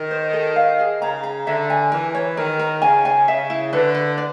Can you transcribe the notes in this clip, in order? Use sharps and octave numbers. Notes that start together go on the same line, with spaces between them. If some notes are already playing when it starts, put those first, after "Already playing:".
Already playing: D#3
C5
A4
F5
G#4
C#3 A#5
A#5
D3 E5
G#5
E3 A#4
C#5
D#3 A#4
A#4
C#3 G#5
G#5
C#3 E5
E4
D3 B4
B4
D5